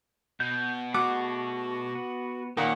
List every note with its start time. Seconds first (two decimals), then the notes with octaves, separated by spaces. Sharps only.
0.40 B2 G6
0.94 A3 F#4 G#4 F#5 D6
1.95 B3
2.57 A#2 D#3 A#3 C#4 F#5